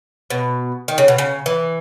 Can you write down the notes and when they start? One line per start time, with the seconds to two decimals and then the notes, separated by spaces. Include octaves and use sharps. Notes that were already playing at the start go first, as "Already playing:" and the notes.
0.30 B2
0.88 D#3
0.98 C#3
1.08 B2
1.18 C#3
1.46 E3